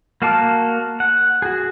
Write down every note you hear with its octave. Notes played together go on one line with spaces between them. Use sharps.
A#3 F#4 F5 A5 D6
F#5
F#4 G#4